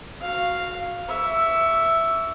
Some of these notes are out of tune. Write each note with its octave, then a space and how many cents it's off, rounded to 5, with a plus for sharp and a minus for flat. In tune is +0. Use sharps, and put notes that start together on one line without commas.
F#4 -15 F5 +0
E5 +0 C#6 +35